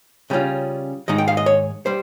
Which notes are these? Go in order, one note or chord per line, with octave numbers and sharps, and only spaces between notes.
C#3 G3 C#4 F4
G#2 D#3 G#3 D#4 D#5
G5
F5
D#5
C#5
G3 C5